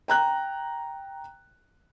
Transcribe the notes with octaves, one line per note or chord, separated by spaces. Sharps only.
G5 A#5 F#6